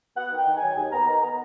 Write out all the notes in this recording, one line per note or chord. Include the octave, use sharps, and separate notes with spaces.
B3 F#5
D#3
G5
D#3
F#3 G#5
D#2 G#5
B3 A#5
D#3 A#5
B3 A#5